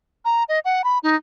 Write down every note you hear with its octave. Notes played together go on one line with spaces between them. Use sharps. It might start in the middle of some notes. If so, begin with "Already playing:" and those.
A#5
D#5
F#5
B5
D#4